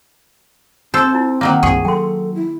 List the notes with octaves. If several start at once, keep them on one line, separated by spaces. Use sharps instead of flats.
C4 D#4 A4 C5 E6
D#4 E4
D#3 F#3 A#3 D6
C2 G2 G#4 C#6
F#3 A4 G5 C6
E4